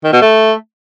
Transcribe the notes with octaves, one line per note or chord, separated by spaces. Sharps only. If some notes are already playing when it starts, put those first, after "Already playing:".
D#3
B2
A3